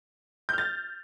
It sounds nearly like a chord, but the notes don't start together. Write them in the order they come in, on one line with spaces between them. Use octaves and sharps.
G6 F6 A6